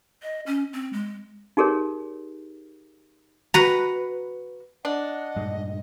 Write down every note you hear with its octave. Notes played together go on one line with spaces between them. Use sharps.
D#5
C#4
C4
G#3
D#4 G4 G#4 A#4 C#5
F#4 B4 A#5
D4 D#5 F#5
G2 A#2 G#3